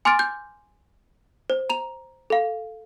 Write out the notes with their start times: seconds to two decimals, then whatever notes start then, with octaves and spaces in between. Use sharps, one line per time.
0.05 G#5 C6 D6 F6 A6 D7
0.19 G6
1.50 C5
1.70 A#5 F7
2.30 A4 F5